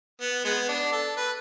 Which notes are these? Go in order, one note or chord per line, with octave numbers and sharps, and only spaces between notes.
B3
G#3 B3
D4
A4
B4